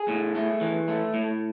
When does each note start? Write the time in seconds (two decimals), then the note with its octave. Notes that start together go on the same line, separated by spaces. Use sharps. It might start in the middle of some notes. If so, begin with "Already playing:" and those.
Already playing: G#4
0.08 A2
0.35 A3
0.61 E3
0.88 A3
1.14 A2